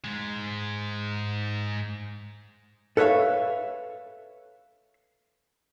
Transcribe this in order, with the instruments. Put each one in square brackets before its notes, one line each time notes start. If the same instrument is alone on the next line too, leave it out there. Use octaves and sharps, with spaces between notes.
[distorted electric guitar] G#2 G#3
[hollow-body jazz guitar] A4 B4 C#5 E5 F5